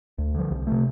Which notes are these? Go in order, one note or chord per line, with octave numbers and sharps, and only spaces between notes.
D2
D3 F3
C2
C3 A3